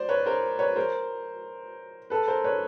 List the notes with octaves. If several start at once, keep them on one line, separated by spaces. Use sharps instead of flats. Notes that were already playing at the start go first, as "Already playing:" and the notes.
Already playing: C5 D5
B4 C#5
A#4 C5
B4 C#5
A#4 C5
A4 B4
A#4 C5
B4 C#5